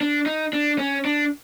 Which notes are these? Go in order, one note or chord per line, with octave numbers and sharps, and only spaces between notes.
D4
D#4
D4
C#4
D4